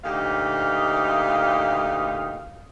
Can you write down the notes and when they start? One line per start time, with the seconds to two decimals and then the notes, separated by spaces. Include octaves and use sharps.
0.04 D2 A#2 D#4 G4 F5